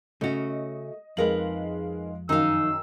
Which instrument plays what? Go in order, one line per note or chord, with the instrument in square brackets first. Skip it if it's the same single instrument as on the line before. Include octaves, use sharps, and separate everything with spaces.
[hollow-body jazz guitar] C#3 C#4 [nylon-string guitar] A3 F#4 [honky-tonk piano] D#5
[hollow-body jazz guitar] F2 [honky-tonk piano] G#3 F5 F#7 [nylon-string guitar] D#4 A#4 B4
[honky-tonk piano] F#2 D#3 [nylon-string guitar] D#4 F5 [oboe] E6